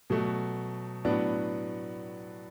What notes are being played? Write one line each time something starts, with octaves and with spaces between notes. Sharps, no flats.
B2 F#3 A3
A2 F#3 B3 D4